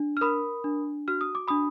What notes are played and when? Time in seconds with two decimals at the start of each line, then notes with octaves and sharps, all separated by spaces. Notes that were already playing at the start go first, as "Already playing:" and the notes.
Already playing: D4
0.17 F6
0.21 A#4 B5 D#6
0.64 D4
1.08 F#4 F6
1.21 D#6
1.35 D6
1.48 D4 B5 D#6